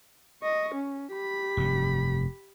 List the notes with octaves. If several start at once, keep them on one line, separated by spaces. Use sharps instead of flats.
D#5 C#6
C#4
G4 B5
F1 G2